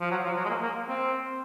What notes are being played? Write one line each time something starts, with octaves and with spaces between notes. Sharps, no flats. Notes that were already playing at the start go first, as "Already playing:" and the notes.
F3
F#3
F3
F#3
G#3
A#3
A#3
C4